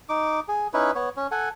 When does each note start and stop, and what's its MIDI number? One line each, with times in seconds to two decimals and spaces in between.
0.09 0.40 63
0.09 0.40 86
0.48 0.68 68
0.74 0.91 61
0.74 0.91 63
0.74 0.91 64
0.74 0.91 71
0.95 1.09 59
0.95 1.09 73
1.17 1.27 61
1.31 1.49 69
1.31 1.49 78
1.31 1.49 80